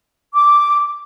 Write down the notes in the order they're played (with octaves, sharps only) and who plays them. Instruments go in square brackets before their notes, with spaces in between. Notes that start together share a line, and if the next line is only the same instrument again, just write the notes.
[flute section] D6